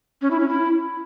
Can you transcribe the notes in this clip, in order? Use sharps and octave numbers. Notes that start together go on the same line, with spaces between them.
C#4
E4
C#4
E4